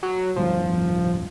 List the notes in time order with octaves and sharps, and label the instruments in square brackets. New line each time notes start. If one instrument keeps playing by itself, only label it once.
[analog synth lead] F#3
[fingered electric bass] D1 G1 G3 [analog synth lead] F3